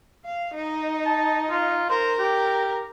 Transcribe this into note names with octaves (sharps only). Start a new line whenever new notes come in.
F5
D#4
A5
F4
A#4 C5
G4